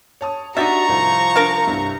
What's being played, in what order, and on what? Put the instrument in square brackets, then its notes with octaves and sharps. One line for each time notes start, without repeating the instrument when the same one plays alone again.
[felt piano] C#5 A5 D#6
[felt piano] D4 A6 [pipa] D#4 G4 E5 [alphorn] F#4 [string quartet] A#5 C#6
[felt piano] C2 [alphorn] F3
[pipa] D4 A#4 F5
[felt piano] C2 G2